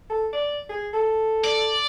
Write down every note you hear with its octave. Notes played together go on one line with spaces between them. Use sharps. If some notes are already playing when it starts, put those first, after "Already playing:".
A4
D5
G#4
A4
D5